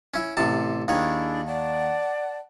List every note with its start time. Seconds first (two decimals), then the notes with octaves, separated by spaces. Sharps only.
0.14 C#4 E4
0.37 A1 C3 A5
0.88 D#2 D#3 D4 E4 G#4 C#5
1.47 D5 F#5 A5